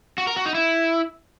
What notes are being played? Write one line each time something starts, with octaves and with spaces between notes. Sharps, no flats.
F#4
A#4
F#4
D#4
E4